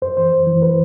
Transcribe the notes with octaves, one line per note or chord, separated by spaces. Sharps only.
F#2 C5
E3 C5
F#2
E3
B4